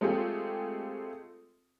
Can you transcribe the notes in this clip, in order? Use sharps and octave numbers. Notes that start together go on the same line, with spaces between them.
G#3 A3 C4 F4 G4 G#4